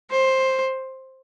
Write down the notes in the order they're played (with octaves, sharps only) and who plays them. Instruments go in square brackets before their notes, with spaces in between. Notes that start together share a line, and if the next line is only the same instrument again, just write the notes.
[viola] C5